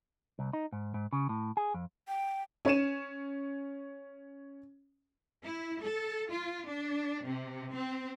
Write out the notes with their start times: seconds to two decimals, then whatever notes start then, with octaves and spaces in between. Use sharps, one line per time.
0.39 C2
0.53 D#4
0.72 G#2
0.94 G#2
1.13 C#3
1.29 A2
1.57 G#4
1.74 F2
2.08 G5
2.65 C#4 C#5 D#7 E7
5.44 E4
5.82 A4
6.31 F4
6.67 D4
7.24 C3
7.72 C4